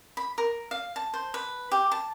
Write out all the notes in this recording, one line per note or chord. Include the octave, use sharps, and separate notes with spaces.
B5
A#4
F5
A5
C5
B4
G4
A5